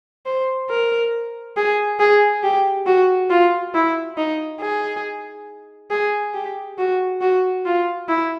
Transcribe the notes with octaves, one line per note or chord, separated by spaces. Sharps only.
C5
A#4
G#4
G#4
G4
F#4
F4
E4
D#4
G#4
G#4
G4
F#4
F#4
F4
E4